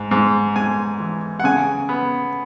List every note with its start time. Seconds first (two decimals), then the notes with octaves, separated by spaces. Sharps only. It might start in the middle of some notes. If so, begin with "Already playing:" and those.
Already playing: G#2
0.11 G#2
0.56 G#2 G#5
1.00 E3
1.40 F#5
1.44 C#3 G#5
1.89 B3